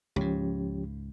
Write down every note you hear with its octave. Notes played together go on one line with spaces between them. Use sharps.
C#2 G#2 F3 C#4 G4